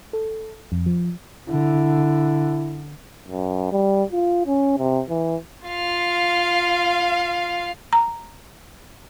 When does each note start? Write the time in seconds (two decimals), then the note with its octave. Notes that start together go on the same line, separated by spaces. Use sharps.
0.13 A4
0.72 F2
0.86 F3
1.49 D3 E4
3.28 F#2
3.72 G3
4.12 F4
4.47 C#4
4.78 C3
5.10 E3
5.67 F4 F5
7.93 A#5